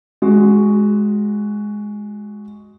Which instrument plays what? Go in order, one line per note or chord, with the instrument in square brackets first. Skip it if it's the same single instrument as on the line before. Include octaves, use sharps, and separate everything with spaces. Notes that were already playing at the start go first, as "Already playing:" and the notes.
[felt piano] G#3 F#4